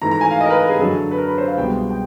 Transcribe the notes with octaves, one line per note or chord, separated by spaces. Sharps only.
G#2 E3 A3 A#5
A#5
G#5
F5
D#5
A#4
B4
A#4
G#4
F#2 D3 F#3 A4
B4
A#4
B4
C5
F5
C2 B2 G#3 B3 G5
G5